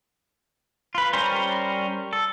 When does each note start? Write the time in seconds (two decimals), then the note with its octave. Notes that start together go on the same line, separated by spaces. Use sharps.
0.95 F4 B4
1.13 G3 C#4 A#4 C5
2.13 A4